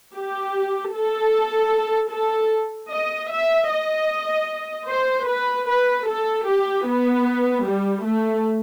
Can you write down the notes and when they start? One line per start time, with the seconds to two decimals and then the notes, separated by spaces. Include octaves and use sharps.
0.13 G4
0.92 A4
2.10 A4
2.90 D#5
3.30 E5
3.69 D#5
4.88 C5
5.27 B4
5.68 B4
6.07 A4
6.47 G4
6.86 B3
7.65 G3
8.05 A3